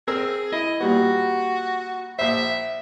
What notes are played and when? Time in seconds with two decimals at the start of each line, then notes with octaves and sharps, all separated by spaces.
0.07 C4 G#4 A#4 E6
0.52 E4 D#5
0.80 A#2 G3 B3 F#4
2.19 A#1 C5 E5